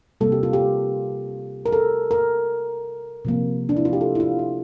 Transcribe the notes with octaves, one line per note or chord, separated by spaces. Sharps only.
C3 G3 A#3 A4
G4
F4
G4
A#4
A4
A#4
C3 F3 A#3
D4
E4
F4
G4
A4
E4
F4
E4